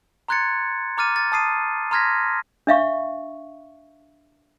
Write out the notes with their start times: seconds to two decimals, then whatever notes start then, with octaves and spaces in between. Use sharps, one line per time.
0.28 A#5 C6 F#6 G#6 A6 C#7
0.98 A#5 D6 F6 A6 D#7
1.16 A6
1.32 A5 D#6 C7 D#7
1.91 A#5 C6 F6 G#6 A#6 B6
2.67 D4 E5 F5 C#6